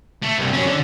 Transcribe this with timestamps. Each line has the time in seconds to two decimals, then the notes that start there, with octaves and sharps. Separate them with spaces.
0.22 A3
0.38 C2 G2
0.53 F#3 C#4
0.67 D3